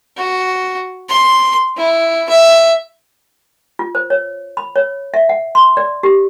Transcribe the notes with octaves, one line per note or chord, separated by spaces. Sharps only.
F#4
C6
E4
E5
F4
C5
C#5
B5
C#5
E5
F#5
C6
D5
G4